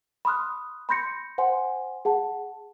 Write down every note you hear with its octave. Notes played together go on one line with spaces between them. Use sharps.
B5 C6 D#6 F6 F#6
B5 C6 G6 A#6 C#7
C5 F#5 G#5 C6
G#4 F#5 A5